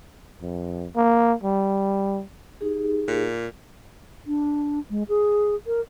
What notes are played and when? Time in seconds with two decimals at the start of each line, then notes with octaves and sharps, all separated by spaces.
0.42 F2
0.96 A#3
1.43 G3
2.61 D#4 G4 G#4
3.08 A#2
4.27 D4
4.90 G#3
5.08 G#4
5.67 A#4